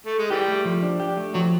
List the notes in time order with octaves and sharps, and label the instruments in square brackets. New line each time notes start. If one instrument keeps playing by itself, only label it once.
[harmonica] A3
G#3
[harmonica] E3 G3 [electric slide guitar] G4
[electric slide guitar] A3
F3
D4
G4
A3
[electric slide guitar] F3 [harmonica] F#3